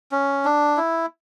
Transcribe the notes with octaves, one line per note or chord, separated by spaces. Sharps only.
C#4
D4
E4